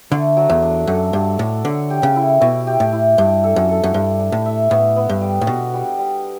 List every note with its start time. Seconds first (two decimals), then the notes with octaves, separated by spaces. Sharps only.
0.11 D3 A3
0.37 F#3
0.50 E2
0.62 D4
0.87 F#2 A4
1.13 G2 D4
1.39 A2 D4
1.64 D3 C#5
1.90 G4
2.03 C#3
2.16 E4
2.41 B2 E4
2.67 G4
2.80 A2
2.92 E4
3.18 G2 D4
3.44 A4
3.56 F#2
3.69 A4
3.84 F#2
3.94 G2 D4
4.19 D4
4.32 A2
4.45 E5
4.70 A2 B3
4.96 B3
5.09 G2
5.21 G3
5.41 A2
5.47 B2 F#4
5.74 G3
5.99 G3